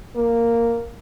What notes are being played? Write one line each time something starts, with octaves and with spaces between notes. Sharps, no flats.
A#3